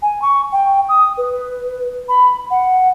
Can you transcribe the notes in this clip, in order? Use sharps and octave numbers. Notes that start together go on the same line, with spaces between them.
G#5
C#6
G5
D#6
B4
B5
F#5